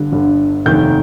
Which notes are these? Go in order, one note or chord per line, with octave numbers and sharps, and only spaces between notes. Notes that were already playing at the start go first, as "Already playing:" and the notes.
Already playing: G1 G2 D3
G1 G2 D3
F1 D#2 D#3 G6